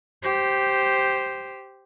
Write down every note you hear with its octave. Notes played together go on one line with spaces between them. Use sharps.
G4 C5